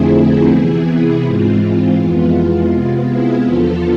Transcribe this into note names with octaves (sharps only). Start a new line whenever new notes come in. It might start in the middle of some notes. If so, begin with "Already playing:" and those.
Already playing: F2 D3 F3 A3 C4 E4 G#4
C3 E3 B3 E4 G#4
G#2 E3 G#3 C4 F4
F2 E3 G#3 B3
F4
C3 G#3 B3
E4 G#4
E2 D3 F3 B3 F4 A4